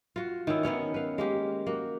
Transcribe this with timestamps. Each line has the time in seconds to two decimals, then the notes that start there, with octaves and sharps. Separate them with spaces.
0.16 F4 F#4
0.47 D#3 C#4 E4
0.63 D#3 B3 C#4 C#5
0.94 B4 F5
1.18 G#3 A#3 G4
1.67 A#3 F#4